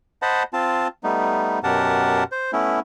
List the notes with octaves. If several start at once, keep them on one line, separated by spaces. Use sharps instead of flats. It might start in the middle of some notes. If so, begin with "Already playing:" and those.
C5 D#5 F#5 A5 B5
C4 F4 A5
G3 A3 B3 D#4
F#2 B2 G4 A#4 F#5 A5
C5
A3 B3 C#4 E4